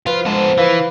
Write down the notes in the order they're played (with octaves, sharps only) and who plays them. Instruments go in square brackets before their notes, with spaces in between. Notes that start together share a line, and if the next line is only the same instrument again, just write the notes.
[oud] F3 [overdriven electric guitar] F4 [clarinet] B4
[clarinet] G#3 [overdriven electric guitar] B3 A4
[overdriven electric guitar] E3 [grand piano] B4 [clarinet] F5